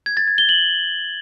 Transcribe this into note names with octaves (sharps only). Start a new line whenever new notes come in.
G#6
A6
G#6
G7
F#7